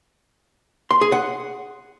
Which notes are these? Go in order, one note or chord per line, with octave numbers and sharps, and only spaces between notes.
C6
G#4
F#5